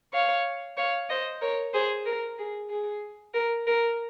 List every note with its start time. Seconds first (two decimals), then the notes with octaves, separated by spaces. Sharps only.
0.13 C#5 F5
0.78 C#5 F5
1.09 C5 D#5
1.41 A#4 C#5
1.73 G#4 C5
2.05 A#4
2.38 G#4
2.70 G#4
3.33 A#4
3.66 A#4